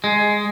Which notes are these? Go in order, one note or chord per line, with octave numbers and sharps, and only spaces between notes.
G#3